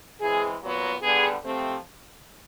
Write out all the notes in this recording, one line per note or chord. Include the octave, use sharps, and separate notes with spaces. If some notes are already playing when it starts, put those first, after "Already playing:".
E3 G#3 C4 G#4
A#2 F#3 B3
D3 G3 B3 G#4
C3 F3 A3 C4